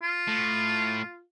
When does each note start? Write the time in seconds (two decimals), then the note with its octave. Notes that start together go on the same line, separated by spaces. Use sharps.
0.03 F4
0.28 A2